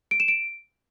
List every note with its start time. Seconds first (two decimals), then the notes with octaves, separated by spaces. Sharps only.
0.11 D7
0.20 E7
0.28 D7